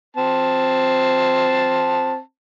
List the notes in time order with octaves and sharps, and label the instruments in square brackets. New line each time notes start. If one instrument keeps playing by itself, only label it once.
[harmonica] C4 A5